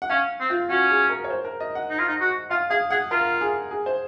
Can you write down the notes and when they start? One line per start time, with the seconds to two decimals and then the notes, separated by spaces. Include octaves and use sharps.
0.02 F#5
0.10 C#4 F5
0.40 C4
0.50 F4
0.70 C#4 F#4
0.90 G#4
1.10 A#4
1.24 C#5
1.30 C5
1.45 A#4
1.60 D#5
1.75 F#5
1.90 D#4
1.99 F4
2.08 D#4
2.21 F#4
2.50 F4 F5
2.71 G#4 F5
2.90 G#4 F#5
3.11 F4 A#4
3.41 G#4
3.71 G#4
3.86 C5